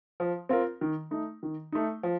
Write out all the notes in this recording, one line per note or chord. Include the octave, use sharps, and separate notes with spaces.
F3
C4 F4 A#4
D#3
A3 D#4
D#3
A3 D#4
F3